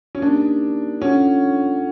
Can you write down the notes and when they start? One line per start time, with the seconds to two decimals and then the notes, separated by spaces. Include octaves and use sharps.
0.15 C#4
0.21 A#3 D4 D#4 G4 A#4
1.01 C#4 D4 F4 A4 C#5 F#5